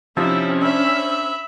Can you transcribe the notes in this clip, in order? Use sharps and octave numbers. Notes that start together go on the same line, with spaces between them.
C3 F3 C4 C#4 D#4 E4 E6
D4 C5 E5 B5 E6